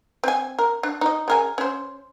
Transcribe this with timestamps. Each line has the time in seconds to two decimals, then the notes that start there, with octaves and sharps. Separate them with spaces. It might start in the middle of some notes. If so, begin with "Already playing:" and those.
0.24 C4 G#5
0.59 A#4
0.83 D4
1.01 D#4 D#5
1.28 C#3 A#4 G#5
1.58 C#4 C5